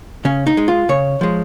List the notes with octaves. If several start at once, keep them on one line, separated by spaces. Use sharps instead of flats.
C#3 C#4
D#4
G#3
F4
C#3 C#5
F3 G#3